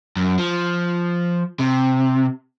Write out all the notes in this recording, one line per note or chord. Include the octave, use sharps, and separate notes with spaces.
F#2
F3
C3